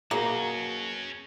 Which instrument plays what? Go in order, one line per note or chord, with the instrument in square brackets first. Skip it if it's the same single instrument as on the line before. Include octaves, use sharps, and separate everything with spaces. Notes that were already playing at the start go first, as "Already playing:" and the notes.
[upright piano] B2 G#4 C7 [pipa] A#3 [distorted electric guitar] C#4 F#4